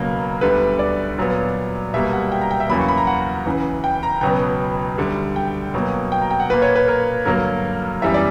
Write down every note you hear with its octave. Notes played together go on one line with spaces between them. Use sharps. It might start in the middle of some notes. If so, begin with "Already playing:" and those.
Already playing: C#2 B2 F#3 A#3
D2 D3 G3 B3 B4
D5
A#2 F#3 B3
B2 G3 A#3 E5
F#5
G5
A#5
G5
E5
E2 C#3 F#3 A#3 B5
C#6
B5
A#5
F#5
C#2 C#3 E3
G5
A#5
C#2 B2 F#3 B3 G5
D2 D3 G3
G5
B2 F#3 A#3
G5
A#5
G5
F#5
A#2 A#3 B4
C#5
B4
A#4
G2 D3 F#3 A#3 A#4
F#2 E3 G3 B3 E5
D5